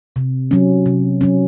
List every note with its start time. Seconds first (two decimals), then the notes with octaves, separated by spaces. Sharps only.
0.16 C3
0.51 F#3 C#4
0.86 C3
1.21 F#3 C#4